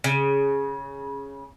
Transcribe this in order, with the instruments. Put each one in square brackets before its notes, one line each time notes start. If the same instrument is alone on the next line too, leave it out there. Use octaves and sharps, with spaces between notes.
[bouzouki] C#3